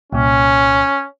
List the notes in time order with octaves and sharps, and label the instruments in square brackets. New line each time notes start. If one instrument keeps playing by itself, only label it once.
[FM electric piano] C2 A#2 [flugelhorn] C#4